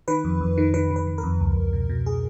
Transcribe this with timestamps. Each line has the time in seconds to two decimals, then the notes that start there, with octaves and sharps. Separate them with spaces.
0.08 D#3 B4
0.24 F2
0.41 F2
0.58 D#3
0.74 D#3 B4
0.91 D#3
0.96 B4
1.07 D#3
1.18 A#4
1.24 F2
1.40 C#2
1.57 C#2
1.73 B2
1.89 B2
2.06 G#4